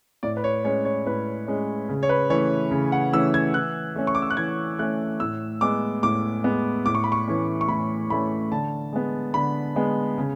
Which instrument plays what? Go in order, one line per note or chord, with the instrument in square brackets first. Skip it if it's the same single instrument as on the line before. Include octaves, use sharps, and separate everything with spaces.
[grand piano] A2 D5
B4
C#5
G#3 C#4 C#5
C#5
A2 B4
G#3 C#4
C#3
C#5
B4
E3 A3 C#4 C#5
C#3
F#5
E3 A3 C#4 E6
G#6
E3 F#6
A3 C#4
C#6
D6
E6
F#6
E3 G#6
A3 C#4 F#6
A2 E6
G#3 B3 D6
A2 D6
G#3 B3
A2 D6
C#6
B5
C#6
E3 A3 C#4
C#6
A2 B5
E3 A3 C#4 B5
D3 A5
G#3 B3
D3 B5
G#3 B3
C#3